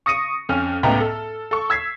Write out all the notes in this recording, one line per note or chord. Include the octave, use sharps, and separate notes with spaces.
C#6 D#6 A#6 C#7 D#7
F2 C#4 F6
C#2 A2 B3 G5 A#5 F7
A4
A4 C#6
E6 G#6 B6 C7